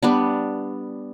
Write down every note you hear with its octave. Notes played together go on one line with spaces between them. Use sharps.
G3 B3 D4